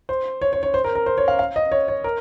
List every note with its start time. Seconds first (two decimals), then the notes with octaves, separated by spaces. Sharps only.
0.09 C5
0.41 C#5
0.53 C#5
0.63 C#5
0.74 C5
0.84 A#4
0.95 A#4
1.06 C5
1.18 C#5
1.28 F5
1.39 F5
1.56 D#5
1.72 C#5
1.88 C#5
2.04 A#4